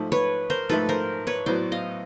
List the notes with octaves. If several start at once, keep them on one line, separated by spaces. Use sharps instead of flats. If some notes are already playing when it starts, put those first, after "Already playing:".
Already playing: G#2 F3 A3
B4 C#5
A#4 C5
G#2 F3 A3 A4 B4
A#4 C5
B4 C#5
A2 F#3 B3 C5 D5
D#5 F5